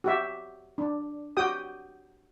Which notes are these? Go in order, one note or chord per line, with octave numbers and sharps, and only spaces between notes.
F#4 G4 E5
D4
F#4 G4 G5 D#6